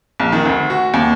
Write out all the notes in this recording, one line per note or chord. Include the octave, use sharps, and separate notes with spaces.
A#1
D#3
D2
F#4
D#2